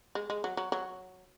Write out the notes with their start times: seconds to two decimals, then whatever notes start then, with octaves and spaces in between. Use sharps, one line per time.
0.15 G#3
0.30 G#3
0.44 F#3
0.57 F#3
0.72 F#3